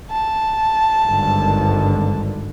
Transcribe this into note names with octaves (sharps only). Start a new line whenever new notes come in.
A5
G#1 G2 D3